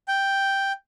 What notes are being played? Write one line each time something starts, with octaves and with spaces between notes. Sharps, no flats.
G5